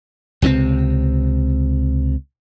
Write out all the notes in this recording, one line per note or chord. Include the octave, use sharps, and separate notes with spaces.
C#2 C3 F#3 C4